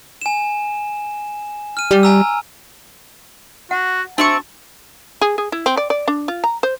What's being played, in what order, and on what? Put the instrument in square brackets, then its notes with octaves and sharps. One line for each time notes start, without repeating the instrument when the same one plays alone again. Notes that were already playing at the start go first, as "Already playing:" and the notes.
[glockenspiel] G#5 E7
F6 D#7
[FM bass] G3
[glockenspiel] G#5 A#5 E6
[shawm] F#4 [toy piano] F#5
[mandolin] C4 E5 C#6 [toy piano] D4 F#4 [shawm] A5
[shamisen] G#4
G#4
E4
C4
D5
D5
D4
F4
A#5
C5